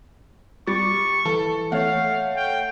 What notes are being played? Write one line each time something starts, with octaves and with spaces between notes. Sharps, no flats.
G3 C#6 D6 A6
E3 A4
A3 C#5 F5 F#5
G5